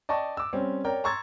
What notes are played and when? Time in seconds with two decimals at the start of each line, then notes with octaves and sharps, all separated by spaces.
0.09 D5 D#5 G5 A5 C#6
0.37 D6 E6
0.53 G3 C4 C#4
0.84 A#4 C#5 D5 G5 A#5
1.04 A#5 C6 C#6 E6 G#6 A6